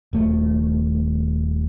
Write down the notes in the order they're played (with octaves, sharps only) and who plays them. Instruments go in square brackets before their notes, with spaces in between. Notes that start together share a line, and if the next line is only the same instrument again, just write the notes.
[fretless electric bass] D#1 A3